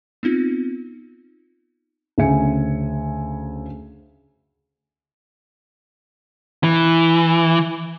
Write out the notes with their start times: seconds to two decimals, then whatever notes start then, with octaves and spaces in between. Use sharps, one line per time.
0.23 B3 C4 D#4 F4
2.18 D2 C#3 G#4 E5 G#5 C#7
6.64 E3